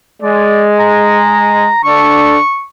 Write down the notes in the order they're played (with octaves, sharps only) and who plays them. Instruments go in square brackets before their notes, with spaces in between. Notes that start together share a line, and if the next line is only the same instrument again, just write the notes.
[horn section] G#3 [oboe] D5
[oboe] A#5
[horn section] D3 D4 A4 [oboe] C#6